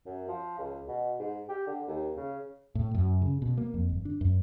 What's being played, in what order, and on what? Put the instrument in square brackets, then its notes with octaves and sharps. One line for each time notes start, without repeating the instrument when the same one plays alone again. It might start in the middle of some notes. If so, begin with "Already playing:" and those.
[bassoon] F#2
F3
C#2
B2
G#2
G4
D3
D#2
C#3
[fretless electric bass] A2
F#2
C#3
B2
A#3
F2
G1
D4
F#2